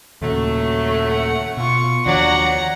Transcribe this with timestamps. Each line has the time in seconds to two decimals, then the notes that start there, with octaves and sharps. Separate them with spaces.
0.22 D#2 A#2 C#3 F#3 A3
1.10 F#5
1.57 B2 F4 C#6
2.06 D#2 D#3 F3 F#3 D4 D5 F#5 A#5